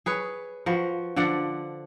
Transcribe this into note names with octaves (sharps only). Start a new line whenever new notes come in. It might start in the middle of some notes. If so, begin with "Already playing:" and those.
G#4 B4 C#5
F3 F#4 B4
D3 F3 D5 F#5